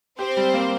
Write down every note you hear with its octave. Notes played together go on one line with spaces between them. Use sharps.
C4 G4 C5
G3
A#3